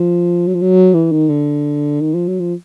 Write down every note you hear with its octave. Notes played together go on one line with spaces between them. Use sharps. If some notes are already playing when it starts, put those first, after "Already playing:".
Already playing: F3
F#3
F3
F#3
E3
D#3
D3
D#3
F3
F#3
F3